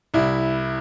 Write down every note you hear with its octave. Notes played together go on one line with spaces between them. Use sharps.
C2 E4